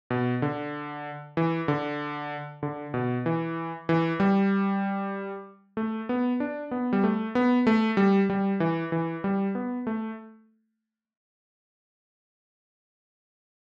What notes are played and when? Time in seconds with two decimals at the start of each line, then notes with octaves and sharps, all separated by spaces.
0.10 B2
0.42 D3
1.37 E3
1.68 D3
2.63 D3
2.94 B2
3.26 E3
3.89 E3
4.20 G3
5.77 A3
6.09 B3
6.40 D4
6.71 B3
6.93 G3
7.04 A3
7.35 B3
7.67 A3
7.97 G3
8.30 G3
8.60 E3
8.92 E3
9.24 G3
9.55 B3
9.87 A3